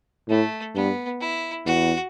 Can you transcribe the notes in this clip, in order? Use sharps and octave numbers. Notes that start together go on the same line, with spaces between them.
A2 A3
G2 B3
E4
E2 F#4